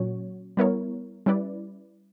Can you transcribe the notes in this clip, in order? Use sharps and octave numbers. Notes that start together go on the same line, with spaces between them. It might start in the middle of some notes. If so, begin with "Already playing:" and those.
Already playing: A#2 F#3 C#4 F#4 C#5
G3 B3 E4 A#4 C#5
G3 C#4 E4 B4 D5